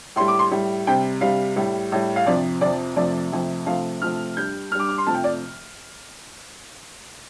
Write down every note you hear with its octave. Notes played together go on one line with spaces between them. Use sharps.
A2 G3 C6
D6
C6
A2 G3
C3 G3 G5
C3 G3 F5
A2 G3
A2 G3
F5
F2 C3 F3 D5
F2 C3 F3 D5
F2 C3 F3 A3 D5
F2 C3 F3 A3
C3 F3 A3 F5
C3 F3 A3 F6
G2 G3 G6
G2 G3 D6 F6
D6
C6
F2 C3 F3 A3 A5
G5
D5